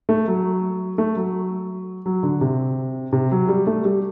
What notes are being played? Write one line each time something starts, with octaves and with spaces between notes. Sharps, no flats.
A3
F#3
A3
F#3
F#3
D3
C3
C3
F#3
G3
A3
G3